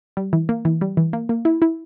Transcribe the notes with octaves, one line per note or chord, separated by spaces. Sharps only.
G3
E3
A#3
E3
G3
E3
A#3
A#3
E4
E4